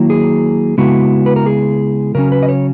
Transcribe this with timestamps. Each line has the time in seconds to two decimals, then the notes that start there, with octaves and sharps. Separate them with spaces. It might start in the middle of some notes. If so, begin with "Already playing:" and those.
Already playing: D#3 F#3 A#3 E4
0.10 G#4
0.78 C#3 G#3 B3 E4 F#4
1.26 B4
1.36 A#4
1.46 G#4
2.15 C#3 F#3 C#4 A#4
2.32 B4
2.43 D#5
2.49 C#5